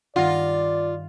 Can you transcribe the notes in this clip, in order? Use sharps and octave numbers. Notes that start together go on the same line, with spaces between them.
G2 D#3 F4 D5 F#5 A#6